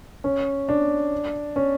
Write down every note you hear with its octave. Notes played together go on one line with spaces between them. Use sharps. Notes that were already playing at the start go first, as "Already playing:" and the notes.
C#4
D4
C#4